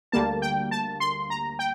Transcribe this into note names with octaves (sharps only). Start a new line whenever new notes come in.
D2 D3 G3 A#3 A5
G5
A5
C6
A#5
G5